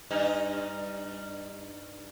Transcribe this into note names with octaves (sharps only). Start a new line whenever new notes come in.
G2 D#4